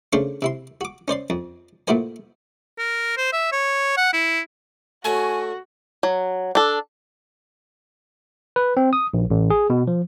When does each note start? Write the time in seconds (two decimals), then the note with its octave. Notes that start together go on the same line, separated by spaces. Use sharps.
0.13 C#3 A3 D4 C5 C6 C#6
0.42 C3 E4 C6
0.81 F#4 D6
1.08 C#4 C5 D5 C6
1.30 F2
1.87 A#2 A3 E4 F#4 C5 G#5
2.78 A#4
3.17 C5
3.33 E5
3.52 C#5
3.97 F#5
4.13 E4
5.04 A3 F#4 C#5 G#5
6.03 F#3
6.55 D4 A4
8.56 B4
8.77 C4
8.93 D#6
9.14 A#1
9.30 A1
9.50 G#4
9.70 B2
9.87 F3